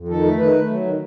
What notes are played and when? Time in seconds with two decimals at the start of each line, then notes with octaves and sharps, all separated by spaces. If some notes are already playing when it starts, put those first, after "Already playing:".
Already playing: F2
0.09 D#3 A4
0.24 A3
0.39 D#3 B4
0.54 A3
0.70 F#3
0.85 D#3